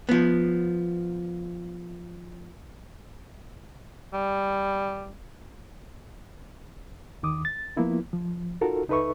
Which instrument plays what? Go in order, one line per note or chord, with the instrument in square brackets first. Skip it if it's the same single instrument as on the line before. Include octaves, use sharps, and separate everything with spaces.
[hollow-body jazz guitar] F3 B3
[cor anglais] G3
[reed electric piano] D#2 D#3 D6 D#6
A6
F3 A#3 B3 E4 F4
F3
D#4 F4 F#4 A4 A#4
C#2 D#4 A4 B4 E5 C#6